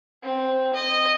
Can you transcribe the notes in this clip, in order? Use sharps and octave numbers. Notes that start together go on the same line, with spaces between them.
C4
D#5